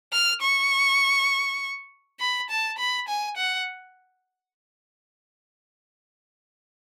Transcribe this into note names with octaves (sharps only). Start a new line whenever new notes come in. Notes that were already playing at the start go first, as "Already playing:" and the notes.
F6
C#6
B5
A5
B5
G#5
F#5